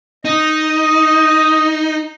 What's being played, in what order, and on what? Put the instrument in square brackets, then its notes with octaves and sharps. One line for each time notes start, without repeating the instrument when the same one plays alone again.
[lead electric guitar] D#4 [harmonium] D#5